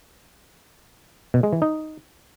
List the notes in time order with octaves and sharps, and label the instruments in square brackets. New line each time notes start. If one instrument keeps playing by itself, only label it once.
[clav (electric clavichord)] B2
G#3
E3
D#4